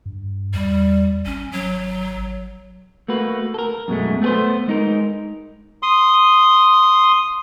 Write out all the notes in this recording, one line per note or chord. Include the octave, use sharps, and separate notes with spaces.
G2
E2 G3
G#1 C#4
F#3
A3 A#3 F#4 B4
A4 A#4
F#2 B2 G#3 A3
A3 B3 G#4 B4 C5
G#3 D#4 A#4
C6 D#6